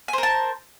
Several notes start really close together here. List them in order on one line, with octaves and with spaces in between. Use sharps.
G#5 C5 A#4 A5